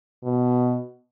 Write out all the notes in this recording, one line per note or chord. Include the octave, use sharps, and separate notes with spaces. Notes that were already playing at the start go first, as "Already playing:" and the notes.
B2